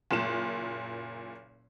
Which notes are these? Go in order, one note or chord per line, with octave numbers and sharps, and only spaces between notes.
F#1 A#2 E7